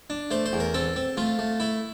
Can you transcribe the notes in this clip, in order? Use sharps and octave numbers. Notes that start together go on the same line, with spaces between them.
D4
A3 C5
C5
E2
A#4
C4 A4
C4
A3 F4
A3
A3 E4